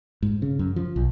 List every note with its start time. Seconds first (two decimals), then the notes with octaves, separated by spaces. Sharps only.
0.23 G#2
0.42 C#3
0.59 F#2
0.76 F3
0.96 B1